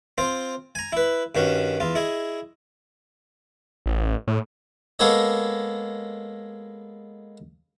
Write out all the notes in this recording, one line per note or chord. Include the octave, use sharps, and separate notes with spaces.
C4 F4 C5
G#5 A#5
E4 B4
G2 D#3 C#4 F#4
E2 F4
E4 G#4 D#5
A1
A2
G#3 A#3 B3 A4 C#5 D#5